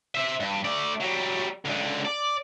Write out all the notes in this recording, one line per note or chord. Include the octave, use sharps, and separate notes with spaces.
C5 E5
G2
A3 D5
F#3 G3
C#2 D3
D5